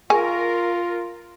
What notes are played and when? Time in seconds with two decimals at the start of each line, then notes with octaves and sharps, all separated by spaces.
0.10 F4 G#4 A#4 G#5 C#6